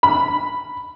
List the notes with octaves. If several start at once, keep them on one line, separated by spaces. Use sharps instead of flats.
B5